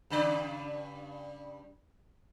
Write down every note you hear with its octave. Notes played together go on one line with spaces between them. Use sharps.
G2 C#3 D5